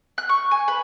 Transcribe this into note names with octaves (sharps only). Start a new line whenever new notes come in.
F#6
C#6
G#5
B4